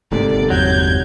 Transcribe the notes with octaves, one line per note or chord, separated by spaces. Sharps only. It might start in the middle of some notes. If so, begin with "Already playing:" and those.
G1 G#2 C3 A#3 A4 D5
E2 F#3 G6 G#6